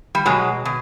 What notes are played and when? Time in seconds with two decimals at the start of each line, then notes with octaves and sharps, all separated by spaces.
0.15 G3
0.26 B2 F#3 G#3
0.65 B2